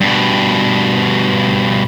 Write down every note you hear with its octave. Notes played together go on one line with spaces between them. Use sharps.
G2 B2